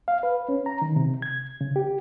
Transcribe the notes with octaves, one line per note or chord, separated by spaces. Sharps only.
F5
B4
C#4
A#5
D#3
C3
G#6
C#3
G4